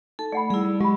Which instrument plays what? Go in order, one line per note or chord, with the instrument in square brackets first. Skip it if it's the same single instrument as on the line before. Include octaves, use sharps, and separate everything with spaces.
[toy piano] D#4 [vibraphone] A4
[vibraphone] A3 [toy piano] D5 F#5 B5
[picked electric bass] G3 [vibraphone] E4 G#4
[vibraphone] F#3 [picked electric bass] G#3 [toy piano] G4 B5